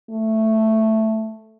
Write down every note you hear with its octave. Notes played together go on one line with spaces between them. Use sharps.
A3